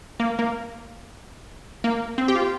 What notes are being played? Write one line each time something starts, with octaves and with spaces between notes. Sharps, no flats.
A#3
A#3
A#3
C4
G4
F4